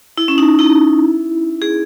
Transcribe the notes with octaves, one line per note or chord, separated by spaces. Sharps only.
E4
C#4
D#4
E4
G#4